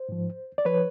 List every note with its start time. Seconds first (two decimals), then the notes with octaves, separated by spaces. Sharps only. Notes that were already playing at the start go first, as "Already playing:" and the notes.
Already playing: C5
0.09 G#2 F3
0.58 D5
0.65 F3 B4 C#5